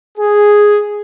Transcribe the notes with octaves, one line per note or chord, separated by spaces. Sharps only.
G#4